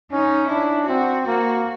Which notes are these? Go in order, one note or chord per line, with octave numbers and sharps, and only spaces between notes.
C#4 D#4
D4 E4
C4 F#4
A#3 F#4